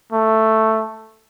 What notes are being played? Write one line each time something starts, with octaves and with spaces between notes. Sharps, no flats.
A3